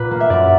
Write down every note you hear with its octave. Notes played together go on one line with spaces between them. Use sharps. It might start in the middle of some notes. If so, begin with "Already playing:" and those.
Already playing: A#2 B4
A#3
E5
F#2 D5